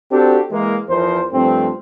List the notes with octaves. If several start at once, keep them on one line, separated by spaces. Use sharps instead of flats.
C4 D4 F#4 G4 A4
E3 G#3 A#3
E2 F3 A#4 C5
G2 F3 A3 C4